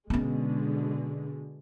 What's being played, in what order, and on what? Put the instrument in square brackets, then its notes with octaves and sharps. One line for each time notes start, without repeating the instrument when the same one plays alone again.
[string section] B2 D3 G#3 [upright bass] B3 C#4